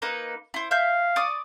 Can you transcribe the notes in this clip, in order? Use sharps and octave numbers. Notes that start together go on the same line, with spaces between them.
A#3 D#4 B4
E4 C5
E5 F5 G6
D5 C#6 D#6